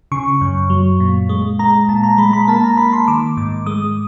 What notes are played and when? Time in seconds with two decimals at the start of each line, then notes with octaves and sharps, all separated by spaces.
0.12 C#3 C#6
0.41 F#2
0.70 F#3
1.00 A#2
1.29 G#3
1.59 G#3 A#5
1.89 A#2 A5
2.03 A#5
2.18 G#3 B5
2.33 B5
2.48 A#3 A5
2.64 A#5
2.77 A#3 B5
2.93 C6
3.08 D#3 D6
3.37 G#2 D6
3.66 G#3 D#6